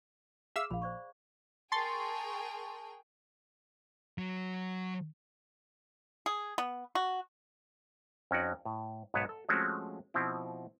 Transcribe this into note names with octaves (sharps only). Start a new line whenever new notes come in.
G#4 E5 F5 E6
A#1 F5 B5
C5 D5 C#6
G#4 A#4 G5 A5 C6 C#6 A6 C7
F#3
G#4
B3
F#4
F2 C#4 D#4 F#4 D5
A2
B1 G#2 B3 B4 C#5 A5
A4
F3 G#3 A3 C4 C#4 F#4
B2 F3 C4 E4